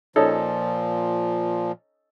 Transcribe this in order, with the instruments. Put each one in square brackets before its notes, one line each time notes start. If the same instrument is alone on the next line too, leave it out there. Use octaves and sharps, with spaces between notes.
[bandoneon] A#2 F3 [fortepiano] C#4 D#4 A4